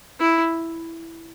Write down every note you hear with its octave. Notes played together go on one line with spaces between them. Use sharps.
E4